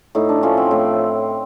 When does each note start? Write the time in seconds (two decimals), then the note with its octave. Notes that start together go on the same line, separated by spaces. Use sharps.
0.15 A2 D#4
0.29 D4
0.43 F3 A3 C#4
0.57 C4
0.71 A2